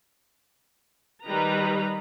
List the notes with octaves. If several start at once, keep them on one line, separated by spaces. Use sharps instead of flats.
D#3 G3 B4 D#5 A#5